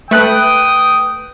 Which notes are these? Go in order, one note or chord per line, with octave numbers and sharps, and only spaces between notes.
A3 B4 G5 D#6 F#6